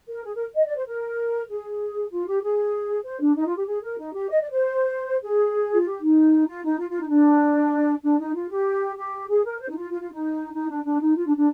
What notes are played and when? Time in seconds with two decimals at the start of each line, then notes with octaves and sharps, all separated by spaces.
0.08 A#4
0.24 G#4
0.35 A#4
0.55 D#5
0.65 D5
0.76 C5
0.86 A#4
1.49 G#4
2.11 F4
2.27 G4
2.42 G#4
3.04 C5
3.20 D4
3.35 D#4
3.46 F4
3.56 G4
3.66 G#4
3.82 A#4
3.98 D#4
4.13 G4
4.29 D#5
4.40 D5
4.50 C5
5.22 G#4
5.73 F4
5.85 G4
6.01 D#4
6.47 F4
6.63 D#4
6.79 F4
6.89 F4
7.00 D#4
7.10 D4
8.04 D4
8.19 D#4
8.34 F4
8.50 G4
8.96 G4
9.28 G#4
9.44 A#4
9.59 C5
9.68 D#4
9.75 F4
9.90 F4
10.01 F4
10.11 D#4
10.53 D#4
10.68 D4
10.84 D4
11.00 D#4
11.15 F4
11.26 D4
11.36 D4